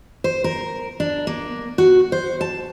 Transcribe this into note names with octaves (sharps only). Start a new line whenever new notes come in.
C5
A#4
D4
A#3
F#4
C5
A5